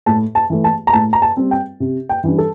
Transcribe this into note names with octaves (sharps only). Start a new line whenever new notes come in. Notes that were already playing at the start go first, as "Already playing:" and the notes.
A2 A5
A5
E3 A3
A5
A#5
A2 A5
A#5
A5
G3 C4
G5
C3
G5
E3 G3 D4
A4